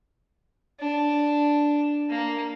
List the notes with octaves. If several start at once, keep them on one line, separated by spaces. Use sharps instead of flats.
D4
A#3